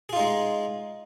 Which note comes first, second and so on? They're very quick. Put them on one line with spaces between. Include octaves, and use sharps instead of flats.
G#4 F4 D#4 G#3